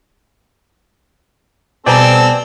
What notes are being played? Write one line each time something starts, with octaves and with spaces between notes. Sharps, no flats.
B2 G3 C4 A4 D5 G5 G#5 A#5